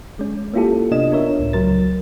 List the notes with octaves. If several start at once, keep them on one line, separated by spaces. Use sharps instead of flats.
G#3 C#4
A#3 C#4 E4 F4 G4 A4
C3 B3 D4 F4 D#5 E7
D4 F4 A#4 C#5 E5
C#2 A2
C#3 F#3 A#4 A6